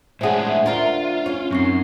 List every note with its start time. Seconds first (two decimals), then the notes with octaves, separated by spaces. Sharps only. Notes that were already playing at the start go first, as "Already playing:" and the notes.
0.21 A2 G#3 C#4 D4 G#4 C5 E5 F#5
0.66 D2 D4 F4 A#4
1.26 C#4
1.51 F#2 C4 D#4 C#6 C7